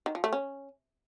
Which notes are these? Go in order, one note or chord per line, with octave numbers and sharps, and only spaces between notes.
D#3
F3
A3
C#4